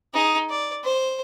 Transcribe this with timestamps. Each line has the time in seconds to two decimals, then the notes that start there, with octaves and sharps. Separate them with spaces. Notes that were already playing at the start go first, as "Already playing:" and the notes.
0.14 D#4 G#4
0.50 D5
0.84 C5